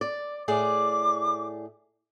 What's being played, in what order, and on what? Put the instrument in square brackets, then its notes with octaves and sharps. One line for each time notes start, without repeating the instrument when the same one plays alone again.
[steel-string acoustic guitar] D5
[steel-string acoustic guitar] A2 G#4 D5 [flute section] D6